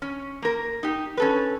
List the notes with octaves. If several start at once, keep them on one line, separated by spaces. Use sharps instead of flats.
C#4
A#3 A#4
D#4 G4
C#4 A4 B4